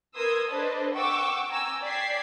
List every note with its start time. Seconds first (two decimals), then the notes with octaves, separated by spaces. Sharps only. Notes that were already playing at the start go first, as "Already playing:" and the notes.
0.15 A#4 B4 C6 D#6 E6 G#6
0.50 D4 A4 B4 C5 D5 D#5
0.94 F#5 G5 C#6 D6 E6
1.49 G5 G#5 A#5 E6
1.82 D5 G5 G#6 B6 C7